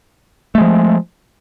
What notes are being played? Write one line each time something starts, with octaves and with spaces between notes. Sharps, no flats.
F3 G#3 A3